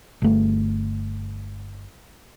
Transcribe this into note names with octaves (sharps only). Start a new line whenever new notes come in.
G1 A3